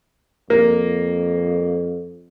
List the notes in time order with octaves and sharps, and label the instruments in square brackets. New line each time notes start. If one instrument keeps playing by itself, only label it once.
[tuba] F2 [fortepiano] A#3